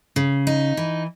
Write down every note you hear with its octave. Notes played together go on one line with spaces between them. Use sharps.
C#3
D#4
E3